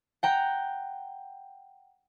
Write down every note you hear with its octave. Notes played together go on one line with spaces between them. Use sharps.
F#5 G5 A#5